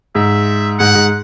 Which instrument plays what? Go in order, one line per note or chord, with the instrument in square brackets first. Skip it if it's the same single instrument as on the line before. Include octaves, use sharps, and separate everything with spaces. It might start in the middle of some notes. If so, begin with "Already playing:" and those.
[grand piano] G#2 [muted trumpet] E5
[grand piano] G#2 [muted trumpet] F#5
[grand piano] G#2